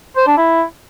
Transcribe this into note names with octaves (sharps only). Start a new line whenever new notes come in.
C5
D4
E4